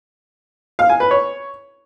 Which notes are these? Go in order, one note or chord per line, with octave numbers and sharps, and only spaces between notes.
F5
G#5
B4
C#5